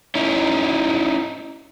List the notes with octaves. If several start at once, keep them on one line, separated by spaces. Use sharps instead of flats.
C#4 D#4 E4